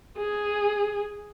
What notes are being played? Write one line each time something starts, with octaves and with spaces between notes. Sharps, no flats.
G#4